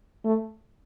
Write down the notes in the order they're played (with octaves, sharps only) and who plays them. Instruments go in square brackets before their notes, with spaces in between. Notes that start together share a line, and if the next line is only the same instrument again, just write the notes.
[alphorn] A3